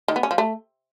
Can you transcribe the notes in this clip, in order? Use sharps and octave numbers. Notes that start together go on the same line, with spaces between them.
D#3
B3
C#4
F3
A3